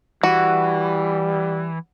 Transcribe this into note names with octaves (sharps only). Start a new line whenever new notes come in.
E3 G3 F#4